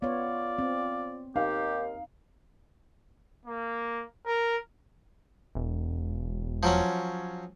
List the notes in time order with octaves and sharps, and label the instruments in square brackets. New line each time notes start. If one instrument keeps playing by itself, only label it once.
[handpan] B3 C#5 [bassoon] F4 [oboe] D5
[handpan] C4
[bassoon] D#2 [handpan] D#4 [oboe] G4 [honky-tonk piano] F5
[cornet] A#3
A#4
[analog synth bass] E1
[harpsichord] F3 F#3 C#4